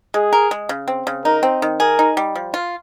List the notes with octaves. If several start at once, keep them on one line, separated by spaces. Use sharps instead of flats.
G#3 G#4
A#4
G#3
C#3
C4
C#3
D#4 A#4
C4
D#3
G#4 A#4
D#4
G3
F3
F4